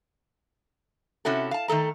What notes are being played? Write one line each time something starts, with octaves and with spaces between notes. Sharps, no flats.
C3 C#4 E4 F#4 A4
F5 A5
D#3 A3 A4 A#5